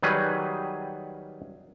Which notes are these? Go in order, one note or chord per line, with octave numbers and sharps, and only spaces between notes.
D#3 F#3 G3 G#4 B4